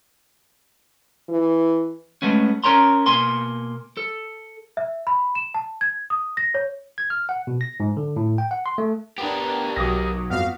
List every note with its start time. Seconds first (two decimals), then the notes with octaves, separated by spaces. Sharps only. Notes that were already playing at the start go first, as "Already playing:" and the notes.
1.29 E3
2.22 G#3 A3 B3 C#4
2.64 C#4 A#4 C#5 A#5 C6
3.06 B2 A#3 G#5 C6
3.97 A4
4.77 E5
5.07 B5
5.35 E7
5.54 A5
5.81 G#6
6.10 D#6
6.37 A#6
6.55 C#5
6.98 G#6
7.10 F6
7.29 F#5
7.47 B2
7.61 A#6
7.80 G#2
7.97 D3
8.16 A2
8.38 G5
8.51 F#5
8.66 C6
8.78 A3
9.18 B3 D4 G4 A#4
9.76 B1 F#3 D6 D#6 A#6
10.30 G1 F2 B3 F#4 F5